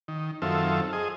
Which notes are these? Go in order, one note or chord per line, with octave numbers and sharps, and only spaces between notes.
D#3
F#2 D#3 C4 F4 A4 E5
G#4 D#5